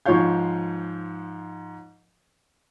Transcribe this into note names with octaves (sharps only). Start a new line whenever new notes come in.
G#2 F3 F4 C#5 F5 G6